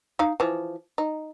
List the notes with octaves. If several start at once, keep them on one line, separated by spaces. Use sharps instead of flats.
D#4 F5
E3 F3
D#4